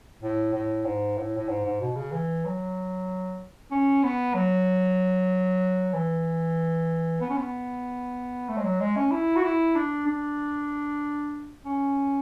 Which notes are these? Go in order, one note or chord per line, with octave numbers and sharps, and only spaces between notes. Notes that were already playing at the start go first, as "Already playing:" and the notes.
A2
A2
G#2
A2
A2
G#2
G#2
B2
C#3
E3
F#3
C#4
B3
F#3
E3
B3
C#4
B3
A3
G#3
F#3
G#3
C#4
E4
F#4
E4
D4
D4
C#4